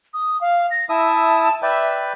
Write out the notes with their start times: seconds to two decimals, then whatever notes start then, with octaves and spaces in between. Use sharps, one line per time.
0.14 D#6
0.41 F5
0.71 A#6
0.89 E4 E5 A5 D#6
1.62 B4 D5 E5 G5